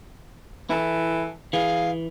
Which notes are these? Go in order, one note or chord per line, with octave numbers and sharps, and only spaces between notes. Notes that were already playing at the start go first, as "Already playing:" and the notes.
E3 E4 A4
E3 G#4 F5